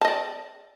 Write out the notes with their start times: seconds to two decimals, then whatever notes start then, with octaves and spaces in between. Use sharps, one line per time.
0.01 A5
0.05 D#5
0.08 D5